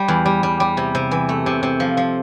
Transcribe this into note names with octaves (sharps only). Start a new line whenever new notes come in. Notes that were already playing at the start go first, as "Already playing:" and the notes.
Already playing: G3
E2
G3
G3
G3
C3
C3
E3
A3
C3
C3
F3
F3